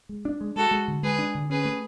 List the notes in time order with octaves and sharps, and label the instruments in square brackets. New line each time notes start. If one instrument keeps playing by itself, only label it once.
[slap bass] G#3
D4
G#3
[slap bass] G#3 [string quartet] F#4 A4
[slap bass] G#3
D3
[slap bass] G#3 [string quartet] G#4 B4
[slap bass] D4
D3
[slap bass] C#4 [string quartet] G#4 B4
[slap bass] A3